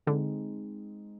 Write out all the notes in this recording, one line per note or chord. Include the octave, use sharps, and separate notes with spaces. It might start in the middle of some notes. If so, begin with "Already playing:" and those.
D3 G#3 C4 D#4